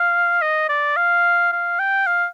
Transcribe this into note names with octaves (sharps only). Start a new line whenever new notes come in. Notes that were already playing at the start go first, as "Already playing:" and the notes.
Already playing: F5
D#5
D5
F5
F5
G5
F5